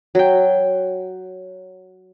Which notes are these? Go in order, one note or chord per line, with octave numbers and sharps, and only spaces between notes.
F#3 G5